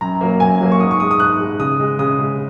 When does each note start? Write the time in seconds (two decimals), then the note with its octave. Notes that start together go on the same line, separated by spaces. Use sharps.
0.01 F#2 A#5
0.21 F#3 A#3
0.40 F#2 G#5
0.61 F#3 A#3
0.72 C#6
0.80 G#2 D#6
0.91 C#6
1.00 G#3 D#6
1.11 D#6
1.19 G#2 F#6
1.40 G#3
1.59 C#3 D#6
1.80 G#3
1.99 C#3 D#6
2.19 G#3